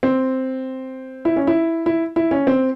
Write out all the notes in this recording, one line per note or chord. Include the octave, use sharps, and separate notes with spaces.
C4
E4
C#4
E4
E4
E4
C#4
C4